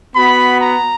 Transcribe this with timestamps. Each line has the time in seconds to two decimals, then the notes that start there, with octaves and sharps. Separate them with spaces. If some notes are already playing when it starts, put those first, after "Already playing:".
0.15 B3 F#4 B5
0.61 A#5